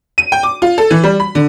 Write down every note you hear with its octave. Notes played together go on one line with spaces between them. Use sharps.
D#7
G5
D6
F4
A4
E3
G3
B5
D3